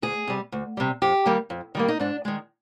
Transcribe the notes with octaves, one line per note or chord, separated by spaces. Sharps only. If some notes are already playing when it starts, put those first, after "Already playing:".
D2 G#4
C3 G3
D2
C3 G3
F2 G4
D#3 G3 A#3
F2
D#3 G3 A#3
D#4
G#2 D4
D#3 G#3